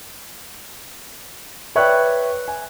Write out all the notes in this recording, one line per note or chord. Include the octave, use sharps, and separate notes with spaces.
B4 C#5 D5 E5 G5 F#6
G#5